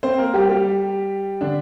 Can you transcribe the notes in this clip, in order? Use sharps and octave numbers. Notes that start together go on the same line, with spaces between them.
C4 C5
A#3 A#4
G3 G4
G3 G4
D3 D4